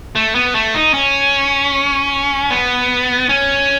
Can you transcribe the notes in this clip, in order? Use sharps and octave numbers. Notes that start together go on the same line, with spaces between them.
A3
B3
A3
D#4
C#4
B3
C#4